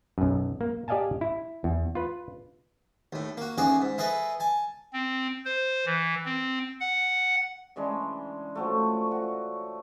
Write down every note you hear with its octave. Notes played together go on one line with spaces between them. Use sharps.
B1 F#2
A#3
G4 D5 D#5 F5 G#5 A5
E4
E2
F4 B4
D#2 A2
A#3 F#4
A1 D#2 F#4 G#4 D5 D#5
G#2
E4 G#4 A4 B4 D#5
G#5 A5
C4
C5
E3
C4
F#5
C#3 E3 G#3 D4
F3 F#3 A3
F#4